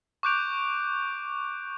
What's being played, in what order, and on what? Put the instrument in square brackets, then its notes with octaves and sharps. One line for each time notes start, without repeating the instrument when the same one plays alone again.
[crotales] C#6 D6 F#6 G6 D7 F7